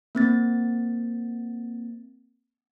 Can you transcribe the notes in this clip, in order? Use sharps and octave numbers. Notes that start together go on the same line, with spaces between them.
A#3 C4 A6